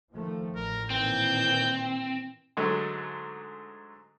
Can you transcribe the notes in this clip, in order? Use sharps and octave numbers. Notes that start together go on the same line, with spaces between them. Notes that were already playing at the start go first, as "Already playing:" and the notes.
D#3 F3 A3
A1 A#4
A#2 D#3 E3 C4 G6
G#2 D3 F#3 G#3 A3